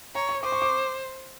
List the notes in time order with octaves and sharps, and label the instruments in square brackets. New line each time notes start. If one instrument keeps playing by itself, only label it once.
[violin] C#5 [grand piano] A#5
[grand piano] C#6
[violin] C5 [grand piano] D6
[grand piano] C#6
D6